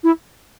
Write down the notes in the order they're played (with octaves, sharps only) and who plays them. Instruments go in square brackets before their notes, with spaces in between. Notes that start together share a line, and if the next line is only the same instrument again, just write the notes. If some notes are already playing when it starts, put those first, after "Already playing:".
[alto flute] E4